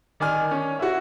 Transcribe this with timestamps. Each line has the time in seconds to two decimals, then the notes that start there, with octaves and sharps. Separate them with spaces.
0.20 D#3 D5 G#5 F6
0.51 C#4
0.79 E4 F#4